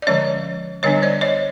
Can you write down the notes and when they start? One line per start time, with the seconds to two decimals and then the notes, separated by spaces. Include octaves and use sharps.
0.02 D5
0.07 D3 F3 G#3 C#4 C#5 D#5
0.83 D3 G3 B3 D4 C#5 D#5
1.02 C5 D5
1.21 C#5 D#5